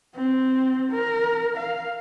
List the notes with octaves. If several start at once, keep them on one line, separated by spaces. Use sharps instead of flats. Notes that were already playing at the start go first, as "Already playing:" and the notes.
C4
A#4
F5